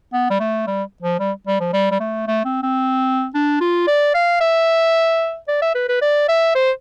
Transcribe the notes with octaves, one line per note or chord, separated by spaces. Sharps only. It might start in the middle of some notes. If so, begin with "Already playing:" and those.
B3
G3
A3
G3
F3
G3
G3
F3
G3
G3
A3
A3
C4
C4
D4
F4
D5
F5
E5
D5
E5
B4
B4
D5
E5
C5